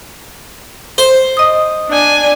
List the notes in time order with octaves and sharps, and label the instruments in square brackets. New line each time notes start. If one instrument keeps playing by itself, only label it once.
[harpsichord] C5
[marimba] D#5 D#6
[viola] D4 G#5